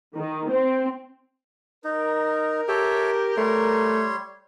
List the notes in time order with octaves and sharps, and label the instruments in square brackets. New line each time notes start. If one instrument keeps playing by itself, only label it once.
[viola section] D#3
C4
[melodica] D#4 [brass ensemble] A#4
[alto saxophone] G4 [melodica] A4 C#5 E5
[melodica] G3 C#5 C6 [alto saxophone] A3